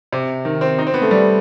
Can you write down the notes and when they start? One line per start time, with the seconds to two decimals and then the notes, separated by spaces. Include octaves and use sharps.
0.12 C3
0.45 D#3
0.61 C4
0.78 D#4
0.87 C4
0.94 B3
1.02 A3
1.11 G3